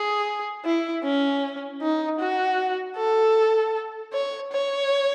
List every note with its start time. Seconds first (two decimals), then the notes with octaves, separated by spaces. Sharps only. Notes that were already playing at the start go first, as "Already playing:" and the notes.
Already playing: G#4
0.65 E4
1.04 C#4
1.82 D#4
2.19 F#4
2.97 A4
4.13 C#5
4.52 C#5